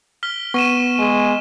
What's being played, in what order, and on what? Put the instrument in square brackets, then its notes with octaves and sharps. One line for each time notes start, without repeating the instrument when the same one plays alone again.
[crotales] F6 B6 G7
[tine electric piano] B3 [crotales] C#6 D#7 E7
[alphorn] G#3